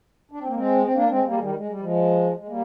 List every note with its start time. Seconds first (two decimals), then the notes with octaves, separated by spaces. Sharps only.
0.31 D4
0.40 C4
0.47 A#3
0.56 G#3 C4
0.83 C4
0.94 A#3 D4
1.09 G#3 C4
1.25 G3 A#3
1.32 G#3
1.40 D#3 G3
1.55 G#3
1.68 G3
1.80 F3 G#3
2.37 G#3
2.48 G3 A#3